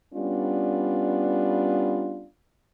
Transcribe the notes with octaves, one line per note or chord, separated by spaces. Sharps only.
G3 B3 C#4 D4 F4